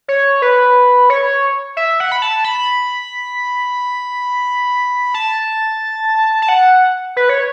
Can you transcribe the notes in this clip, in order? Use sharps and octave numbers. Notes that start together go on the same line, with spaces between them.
C#5
B4
C#5
E5
F#5
B5
A5
B5
A5
A5
F#5
B4
C#5